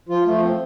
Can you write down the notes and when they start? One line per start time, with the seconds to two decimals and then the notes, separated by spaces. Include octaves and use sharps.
0.09 F3 F4
0.26 F3 A3
0.43 C4